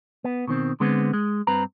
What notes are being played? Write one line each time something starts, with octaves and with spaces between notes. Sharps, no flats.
B3
B2 D#3 C4
D3 G#3 B3 C4
G#3
G2 C4 B4 A#5